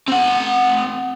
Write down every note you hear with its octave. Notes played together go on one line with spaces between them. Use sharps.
C4 F#5